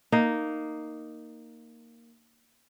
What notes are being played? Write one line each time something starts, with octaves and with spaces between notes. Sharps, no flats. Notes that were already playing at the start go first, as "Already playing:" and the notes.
A#3 D#4